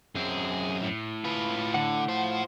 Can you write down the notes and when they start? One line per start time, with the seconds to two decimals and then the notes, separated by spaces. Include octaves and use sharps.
0.15 F#2 C4 G#4
0.83 A2
1.24 F4 B4
1.74 D3 F#5
2.09 F4 C5